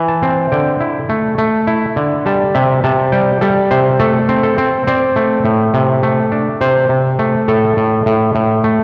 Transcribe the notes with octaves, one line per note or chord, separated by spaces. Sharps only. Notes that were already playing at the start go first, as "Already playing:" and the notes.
Already playing: E3
A5
C4
D3 G5
E4
A3
A3
E4
D3
G3 A5
C3 E5
C3 A5
G3 G5
G3 A4
C3 C5
A3 A4
C4
A4
C4
C4 D5
A3
A2
C3
A3
D4
C3 C5
C3
A3
A2 A4
A2
A2
A2
A3